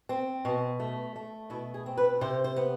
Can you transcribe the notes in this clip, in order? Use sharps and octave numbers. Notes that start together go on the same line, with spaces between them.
C4
B2
A3
A3
B2 E4
G#4
C4
B4
C3 C5
C5
B3